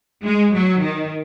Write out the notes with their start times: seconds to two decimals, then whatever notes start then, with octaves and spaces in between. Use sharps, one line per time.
0.24 G#3
0.54 F#3
0.81 D#3